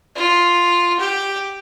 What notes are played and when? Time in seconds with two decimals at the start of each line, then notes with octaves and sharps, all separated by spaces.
0.16 F4
1.00 G4